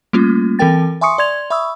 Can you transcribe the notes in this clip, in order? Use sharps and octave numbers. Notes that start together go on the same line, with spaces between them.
G3 A3 A#3 C#4 F4
E3 C4 A4 A#4 G5 A6
E5 G#5 C6 C#6 D#6 C#7
D5 C6 G#6 F7
E5 B5 C#6 D#6 E6